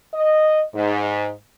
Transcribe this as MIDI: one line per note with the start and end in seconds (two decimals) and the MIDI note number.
0.14 0.63 75
0.75 1.30 44